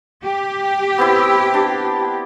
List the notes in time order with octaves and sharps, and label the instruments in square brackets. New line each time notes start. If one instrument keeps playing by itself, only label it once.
[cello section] G4
[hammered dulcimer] B3 C4 E4
D4